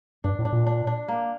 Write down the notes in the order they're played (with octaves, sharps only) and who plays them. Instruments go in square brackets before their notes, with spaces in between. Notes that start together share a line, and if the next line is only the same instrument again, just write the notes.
[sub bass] G2 [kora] D4
[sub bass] A2
[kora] D4
[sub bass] A#2
[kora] D4
D4
A#3